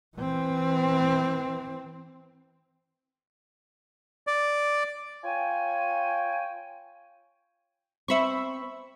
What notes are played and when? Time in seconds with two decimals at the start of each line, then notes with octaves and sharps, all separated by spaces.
0.17 E3 C4
4.27 D5
5.24 F4 C#5 G5 G#5
8.08 C4 C5 E5 B5 C#6